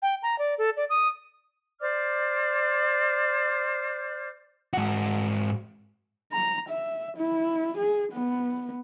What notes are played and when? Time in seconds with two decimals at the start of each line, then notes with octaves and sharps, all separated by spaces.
0.02 G5
0.23 A#5
0.39 D5
0.58 A4
0.77 D5
0.90 D#6
1.80 C5 D5 D6 F6
4.73 G#2 F#4
6.32 A#5
6.69 E5
7.17 E4
7.77 G#4
8.12 B3